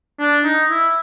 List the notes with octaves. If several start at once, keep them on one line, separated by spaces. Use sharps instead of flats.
D4
D#4
E4